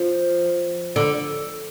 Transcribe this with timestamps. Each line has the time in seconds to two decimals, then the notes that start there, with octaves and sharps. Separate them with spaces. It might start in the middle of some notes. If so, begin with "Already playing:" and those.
Already playing: F3
0.96 D3